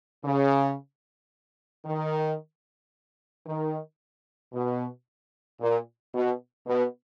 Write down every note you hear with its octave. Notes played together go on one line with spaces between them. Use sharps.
C#3
D#3
D#3
B2
A#2
B2
B2